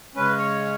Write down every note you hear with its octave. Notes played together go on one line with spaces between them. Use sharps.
C#3 G#3 C#4 B4
C#5